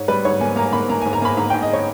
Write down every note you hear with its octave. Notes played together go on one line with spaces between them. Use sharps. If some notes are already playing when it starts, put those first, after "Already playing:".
Already playing: G#2 C#5
G3 B4
G#2 C#5
A#3 G#5
A#3 A#5
A#3 B5
A#3 A#5
G#5
G#2
A#5
A#3 B5
G#2 A#5
G5
G#2
D#5
C#5